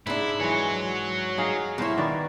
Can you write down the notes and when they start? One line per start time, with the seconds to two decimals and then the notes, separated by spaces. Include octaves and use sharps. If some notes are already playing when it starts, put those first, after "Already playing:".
0.07 G#2 D4 E4
0.40 E3 G#3 F#4 C#5
1.38 D#4 G#4 F5
1.78 B2 E4 A#4 C5 C#5
1.98 D#3 B3 D5